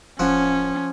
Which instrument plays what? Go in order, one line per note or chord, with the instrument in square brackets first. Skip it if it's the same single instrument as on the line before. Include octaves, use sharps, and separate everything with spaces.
[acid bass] D1 [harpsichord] F3 F#5 [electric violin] C#4